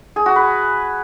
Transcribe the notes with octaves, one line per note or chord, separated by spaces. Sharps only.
G#4
F#4
B4